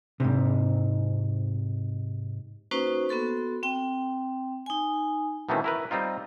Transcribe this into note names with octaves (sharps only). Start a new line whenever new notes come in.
G#2 C3
A#3 C#4 D#4 F#4 B4 C5
B3 F#4 A4 C6
C4 G5
D#4 G#5
B2 D#3 E3 A3 C4 C#4
E4 A#4 B4
G3 C4 D#4 F4